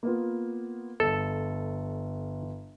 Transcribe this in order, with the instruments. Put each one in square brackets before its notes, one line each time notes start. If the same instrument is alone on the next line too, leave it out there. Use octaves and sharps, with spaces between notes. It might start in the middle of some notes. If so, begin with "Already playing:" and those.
[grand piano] A#3 B3 F4
[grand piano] G1 [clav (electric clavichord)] A4